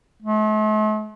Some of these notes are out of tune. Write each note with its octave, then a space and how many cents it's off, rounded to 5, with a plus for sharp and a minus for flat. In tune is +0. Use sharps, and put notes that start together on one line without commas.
A3 -45